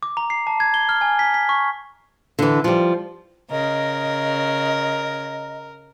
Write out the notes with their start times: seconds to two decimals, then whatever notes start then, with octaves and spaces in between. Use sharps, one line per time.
0.03 D6
0.17 A#5
0.30 C7
0.47 A5
0.60 G#6
0.74 G7
0.89 F6
1.01 G#5
1.19 B6
1.34 B6
1.49 C#6
2.39 D3 E3
2.64 F3 G3
3.51 C#3 A#4 D#5